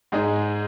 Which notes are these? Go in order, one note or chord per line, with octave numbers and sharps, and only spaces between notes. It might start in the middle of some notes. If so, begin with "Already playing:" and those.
G#2 G#3 D#4 G#4